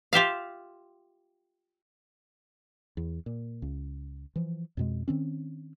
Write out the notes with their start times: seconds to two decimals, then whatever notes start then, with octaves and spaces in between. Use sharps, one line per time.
0.13 F4 G4 E5 F5
2.97 E2
3.26 A#2
3.62 C#2
4.36 E3 F3
4.77 F2 B2 G#3
5.08 D#3 C4 C#4